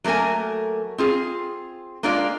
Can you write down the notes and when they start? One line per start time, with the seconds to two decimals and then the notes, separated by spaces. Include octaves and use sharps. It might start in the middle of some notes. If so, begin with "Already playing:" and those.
0.04 F#3 A3 A#3 A#4 G#5
0.98 C4 F4 G#4
2.03 G#3 A#3 D4 F4 D5 F5